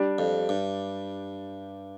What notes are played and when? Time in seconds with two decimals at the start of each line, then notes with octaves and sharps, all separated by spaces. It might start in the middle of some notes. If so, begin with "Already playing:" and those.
Already playing: G3 D4 G4 D5
0.18 F2
0.49 G2